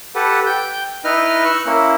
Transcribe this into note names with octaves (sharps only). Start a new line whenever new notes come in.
G4 A4 B4 F#5
G5 G6
D#4 E4 B4 D#5 F6
C#6 E6 F#6
A#3 C#4 E4